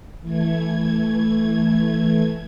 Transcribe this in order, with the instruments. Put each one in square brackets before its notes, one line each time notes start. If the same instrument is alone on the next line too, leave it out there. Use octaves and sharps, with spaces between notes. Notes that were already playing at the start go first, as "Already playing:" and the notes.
[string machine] E3 A3 G#6